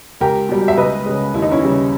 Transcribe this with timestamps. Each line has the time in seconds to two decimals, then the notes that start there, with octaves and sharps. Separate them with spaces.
0.21 C#2 G4 A#4
0.49 B2 G3
0.68 E5
0.77 C#2 B4 D#5
1.06 C#3 G#3
1.34 D#2 E4
1.42 D#4
1.51 C#4 E4
1.62 C#3 E3 G3